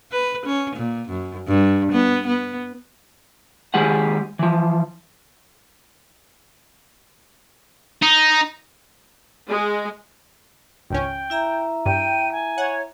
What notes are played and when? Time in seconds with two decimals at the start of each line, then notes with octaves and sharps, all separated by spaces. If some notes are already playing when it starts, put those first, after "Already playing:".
0.11 B4
0.46 C#4
0.76 A#2
1.09 F#2
1.47 G2
1.92 B3
2.26 B3
3.74 D#3 G#3 G4 G#4 F#5
4.39 E3 F3
8.02 D#4
9.49 G#3
10.90 G#1 C#2 C#4 G5
11.30 E4 E5 A#5
11.86 G2 G5 D#7
12.32 G#5
12.58 C#5 F#5